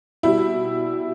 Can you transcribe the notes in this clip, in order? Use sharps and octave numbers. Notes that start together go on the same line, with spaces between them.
B2 G3 E4